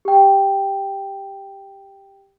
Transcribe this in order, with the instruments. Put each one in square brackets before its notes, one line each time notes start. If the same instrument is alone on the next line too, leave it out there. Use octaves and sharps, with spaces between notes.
[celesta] G4 G5